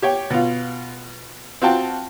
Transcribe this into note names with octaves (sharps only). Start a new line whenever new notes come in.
G4 C#5 G5
B2 F4
C4 F4 F#4 G5 A5